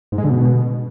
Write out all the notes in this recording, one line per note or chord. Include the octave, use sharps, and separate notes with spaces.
G#2
G#3
D3
B2